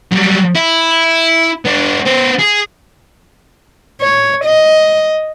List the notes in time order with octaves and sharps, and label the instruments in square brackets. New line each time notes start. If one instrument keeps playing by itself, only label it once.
[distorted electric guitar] F#3 G3
E4
B3 D4
B3 C5
G#4
[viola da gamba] C#5
D#5